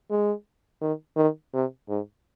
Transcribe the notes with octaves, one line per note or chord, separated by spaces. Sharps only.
G#3
D#3
D#3
C3
G#2